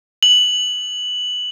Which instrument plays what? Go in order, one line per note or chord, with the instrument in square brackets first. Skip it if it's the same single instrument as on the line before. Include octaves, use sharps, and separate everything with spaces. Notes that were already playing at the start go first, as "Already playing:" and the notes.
[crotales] F#7